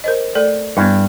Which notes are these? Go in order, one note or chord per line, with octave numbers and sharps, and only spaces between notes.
A#4 C5 D#5
A3 A4 D5
G2 B3 E4